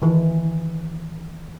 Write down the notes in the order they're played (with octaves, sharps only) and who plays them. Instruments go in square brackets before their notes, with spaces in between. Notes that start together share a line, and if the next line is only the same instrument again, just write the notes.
[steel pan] D#3 E3